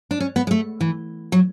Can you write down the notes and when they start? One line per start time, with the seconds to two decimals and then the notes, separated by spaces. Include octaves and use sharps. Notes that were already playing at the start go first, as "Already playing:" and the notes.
0.11 D4
0.20 C#4
0.36 B3
0.47 G#3
0.51 A3
0.81 E3
1.32 F#3